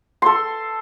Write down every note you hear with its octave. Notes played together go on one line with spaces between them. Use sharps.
A4 C6